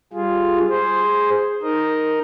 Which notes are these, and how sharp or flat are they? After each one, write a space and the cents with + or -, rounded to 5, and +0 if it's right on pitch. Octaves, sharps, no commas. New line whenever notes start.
G3 +0 F4 +0 G#4 +0
G#4 +0 C5 +0
D#4 +0 A#4 +5 D#5 +0